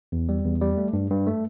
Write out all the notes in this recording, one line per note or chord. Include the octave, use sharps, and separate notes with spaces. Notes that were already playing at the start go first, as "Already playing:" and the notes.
E2
G3
E2
G3
A3
G2
G2
A3